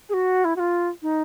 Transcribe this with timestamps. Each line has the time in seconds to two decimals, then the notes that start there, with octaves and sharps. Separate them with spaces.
0.09 G#4
0.13 F#4
0.44 E4
0.56 F#4
0.59 F4
1.02 D#4